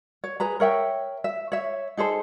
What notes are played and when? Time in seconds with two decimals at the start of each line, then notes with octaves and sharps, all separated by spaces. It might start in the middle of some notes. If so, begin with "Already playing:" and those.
0.24 C#5
0.40 G#4 B4 A#5
0.60 A#4 C#5 E5 G5
1.24 E5
1.52 C#5 E5
1.97 D#4 G#4 A4 C5